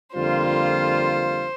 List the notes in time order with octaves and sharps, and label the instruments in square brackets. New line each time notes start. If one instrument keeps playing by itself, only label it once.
[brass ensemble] F2 D3 G3 A#3 F4 [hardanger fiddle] C5